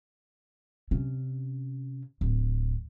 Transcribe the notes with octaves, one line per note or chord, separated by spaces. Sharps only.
C3 C#4
D1